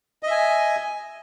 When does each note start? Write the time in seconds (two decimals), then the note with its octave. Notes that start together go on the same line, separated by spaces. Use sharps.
0.23 D#5
0.27 E5
0.31 G#5